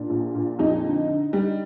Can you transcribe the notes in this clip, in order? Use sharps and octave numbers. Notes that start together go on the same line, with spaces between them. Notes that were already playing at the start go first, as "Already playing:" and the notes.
Already playing: A#2 D4
A#1
A#2
F2 D#4
D3
D3
G3